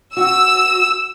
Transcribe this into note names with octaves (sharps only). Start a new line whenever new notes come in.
F#4 E6